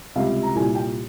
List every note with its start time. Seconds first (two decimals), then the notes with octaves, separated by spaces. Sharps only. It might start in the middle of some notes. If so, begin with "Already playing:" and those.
0.15 C#2 C3 G3 F5
0.43 A#5
0.55 C2 A#2 G3 G#5
0.75 G5